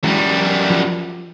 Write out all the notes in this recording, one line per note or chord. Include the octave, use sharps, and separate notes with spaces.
F#2 E3 G3 G#3
F3